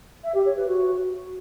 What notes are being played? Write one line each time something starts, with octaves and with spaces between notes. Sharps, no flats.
E5
G4
C#5
B4
F#4